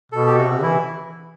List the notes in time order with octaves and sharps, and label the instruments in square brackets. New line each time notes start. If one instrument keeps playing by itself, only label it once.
[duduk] B2 [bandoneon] A4
[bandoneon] G4
[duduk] C3 [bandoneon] F#4
[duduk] B2
C3
[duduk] E3 [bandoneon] E4